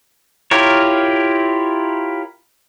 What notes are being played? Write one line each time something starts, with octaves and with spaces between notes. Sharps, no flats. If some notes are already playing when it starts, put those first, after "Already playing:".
E4 F4 G4 A#4 C#5